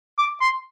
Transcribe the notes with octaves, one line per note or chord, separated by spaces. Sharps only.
D6
C6